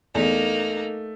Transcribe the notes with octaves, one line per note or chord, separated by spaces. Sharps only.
E2 A3 A#3 D#4